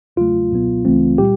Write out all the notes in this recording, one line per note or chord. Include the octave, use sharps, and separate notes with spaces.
E2 C#3 F#3 A3 F4
C#2 B2 F#3 B3
C#2 C#3 E3 A3 C4
A#2 G3 G4